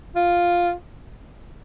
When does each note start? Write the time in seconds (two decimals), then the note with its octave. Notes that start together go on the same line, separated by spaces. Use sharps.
0.16 F4